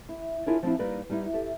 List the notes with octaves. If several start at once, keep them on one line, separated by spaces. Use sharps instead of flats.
E4
D4 E4 F4 G#4 A#4 C#5
F3 C4 D4 E4
G3 A#3 D#4 B4 D5
G3 B3 D#4 E4
G4 A4 E5